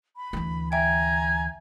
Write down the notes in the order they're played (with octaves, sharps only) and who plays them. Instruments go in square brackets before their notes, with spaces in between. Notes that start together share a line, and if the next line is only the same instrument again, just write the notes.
[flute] B5
[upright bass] D2 E3
[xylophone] E5 G5 [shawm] G#5 [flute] A#5